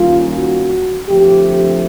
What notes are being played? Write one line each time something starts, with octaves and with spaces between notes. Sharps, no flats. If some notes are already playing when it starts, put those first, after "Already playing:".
Already playing: D#3 G3 A#3 C#4 F4
F#4
D3 F3 A3 C4 G4